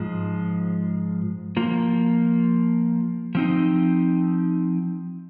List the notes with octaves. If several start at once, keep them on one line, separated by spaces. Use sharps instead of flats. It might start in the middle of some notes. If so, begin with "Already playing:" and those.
Already playing: G#2 F3 G#3
F3 A#3 F4
F3 C4 D#4